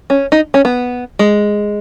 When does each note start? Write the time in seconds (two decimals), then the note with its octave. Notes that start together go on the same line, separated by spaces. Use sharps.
0.10 C#4
0.32 D#4
0.54 C#4
0.65 B3
1.19 G#3